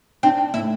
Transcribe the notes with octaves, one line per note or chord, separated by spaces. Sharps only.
C4 D4
A2 E4